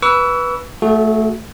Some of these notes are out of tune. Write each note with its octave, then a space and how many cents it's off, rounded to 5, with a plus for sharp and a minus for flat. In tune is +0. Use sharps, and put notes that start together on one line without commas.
B4 -10 C#6 +40 E6 +0
A3 +0 F#4 -10 A4 -45